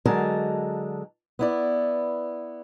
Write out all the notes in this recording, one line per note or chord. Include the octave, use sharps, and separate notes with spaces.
D3 F#3 G#3 A#4 A5
B3 E4 D5